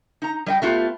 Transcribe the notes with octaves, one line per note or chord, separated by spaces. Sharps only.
D#4 A#5
G3 D#5 G5
A3 B3 F4 G4